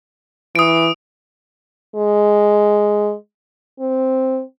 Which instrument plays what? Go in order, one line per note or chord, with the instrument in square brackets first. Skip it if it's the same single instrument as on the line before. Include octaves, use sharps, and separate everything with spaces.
[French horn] E3 [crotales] D#6 D7
[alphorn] G#3
C4